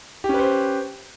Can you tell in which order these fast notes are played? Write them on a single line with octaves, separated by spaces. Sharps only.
G4 C#4 B4 C5